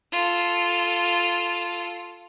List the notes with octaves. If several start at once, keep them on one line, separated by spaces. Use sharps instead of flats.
F4 A4